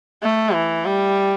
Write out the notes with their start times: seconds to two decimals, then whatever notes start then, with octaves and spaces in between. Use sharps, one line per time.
0.22 A3
0.54 E3
0.86 G3